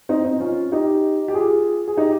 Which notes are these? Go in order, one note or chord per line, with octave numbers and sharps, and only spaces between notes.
C4 D#4
C4 D#4
C#4 F4
D#4 G4
G4
F4 G#4
G#4
D#4 G4